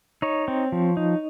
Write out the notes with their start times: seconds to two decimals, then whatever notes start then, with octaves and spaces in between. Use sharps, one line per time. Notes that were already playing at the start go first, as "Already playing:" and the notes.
0.22 D#4 C#5
0.48 C4
0.72 F3
0.97 D#4